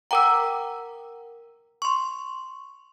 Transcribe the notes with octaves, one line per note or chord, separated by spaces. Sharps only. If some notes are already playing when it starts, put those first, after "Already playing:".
A#4 F#5 G5 A#5 D6 E6
C6 C#6